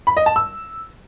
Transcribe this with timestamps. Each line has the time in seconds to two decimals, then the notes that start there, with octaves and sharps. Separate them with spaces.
0.07 B5
0.17 D#5
0.26 A5
0.36 E6